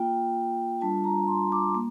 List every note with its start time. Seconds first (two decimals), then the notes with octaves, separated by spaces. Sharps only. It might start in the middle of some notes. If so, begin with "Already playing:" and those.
Already playing: A#3 F4 G5
0.80 G3 D4 F4 A5
1.04 A#5
1.28 C6
1.52 D6
1.75 A#3